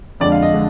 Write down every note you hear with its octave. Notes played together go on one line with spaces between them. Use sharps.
F2 D3 G#3 D5
F5
D#5
D3 G#3